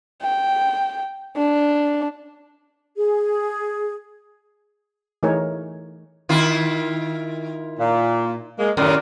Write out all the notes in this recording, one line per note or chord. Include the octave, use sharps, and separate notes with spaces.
G5
D4
G#4
E3 A3 D#4 G#4 A#4 C#5
D#3 E4 F4
A#2
G#3 A#3
F#2 A2 C3 D#3 A#4 D5